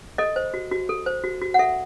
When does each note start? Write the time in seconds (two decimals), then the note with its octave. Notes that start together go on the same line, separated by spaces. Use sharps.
0.18 A4 D#5
0.36 C5
0.54 F#4
0.72 F#4
0.89 A4
1.06 C5
1.24 F#4
1.42 F#4
1.54 F#5
1.59 A4 E5